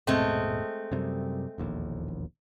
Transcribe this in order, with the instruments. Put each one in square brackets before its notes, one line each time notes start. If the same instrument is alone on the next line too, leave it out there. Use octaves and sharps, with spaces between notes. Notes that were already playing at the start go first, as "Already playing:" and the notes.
[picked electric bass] D#1 G#2 B2 [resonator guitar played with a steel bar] G#3 A3 C4
[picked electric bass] F#2 C3 G3
E1 A#1 D#2